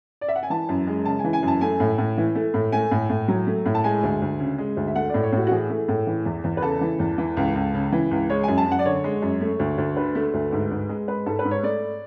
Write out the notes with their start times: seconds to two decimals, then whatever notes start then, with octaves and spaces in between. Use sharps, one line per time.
0.21 D5
0.28 E5
0.35 F#5
0.43 G#5
0.50 E3 A5
0.69 F#2
0.87 G#3
1.05 C#3 A5
1.19 G#5
1.24 E3
1.33 G#5
1.43 F#2 A5
1.61 A3 G#5
1.80 A2
1.98 A2
2.18 E3
2.35 A3
2.54 A2
2.72 A3 G#5
2.91 A2
3.10 A2
3.28 F#3
3.47 A3
3.66 A2
3.75 A5
3.84 G#3 G#5
4.03 D2
4.22 D2
4.39 C#3
4.58 G#3
4.77 D2
4.87 E5
4.96 A3 F#5
5.10 A2 D5
5.23 C#5
5.33 A2 F#4
5.47 F#4
5.51 E3 G#4
5.70 A3
5.88 A2
6.07 E3
6.25 E2
6.44 E2
6.57 B4
6.62 C#3 A4
6.81 E3
6.99 E2
7.18 E3
7.37 C#2
7.55 C#2
7.74 C#3
7.92 E3
8.11 C#2
8.30 G#3 C#5
8.43 F#2 G#5
8.58 A5
8.67 F#2 F#5
8.79 D5
8.85 D3 C#5
9.04 G#3
9.22 F#2
9.41 A3
9.59 D2
9.78 D2
9.96 D3 B4
10.15 A3
10.34 D2
10.52 G#2
10.71 G#2
10.89 G#3
11.08 G#3 B4
11.26 G#2 A4
11.39 B4
11.45 G#2
11.51 C#5
11.63 A3 D5